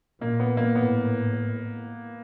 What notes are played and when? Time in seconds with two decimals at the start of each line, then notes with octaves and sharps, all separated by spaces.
0.20 A#2 A#3
0.40 B3
0.57 A#3
0.75 A2 B3